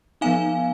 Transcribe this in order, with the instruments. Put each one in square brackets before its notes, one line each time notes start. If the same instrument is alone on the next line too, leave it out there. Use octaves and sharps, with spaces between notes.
[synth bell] F3 B3 D#4 F5 G#5